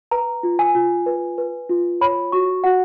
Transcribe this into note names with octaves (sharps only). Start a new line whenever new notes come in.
B4 A#5
F4
G#5
F4
B4
B4
F4
C#5 B5
F#4 C#6
F#4 F#5